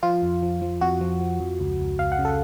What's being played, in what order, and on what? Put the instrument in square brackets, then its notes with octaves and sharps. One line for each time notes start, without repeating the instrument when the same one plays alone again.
[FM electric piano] F3 F4
F2
F3
F3
F2 F#4
F3
F3
F2
C#2
C#2
C#2 F5
F#5
C#3
A4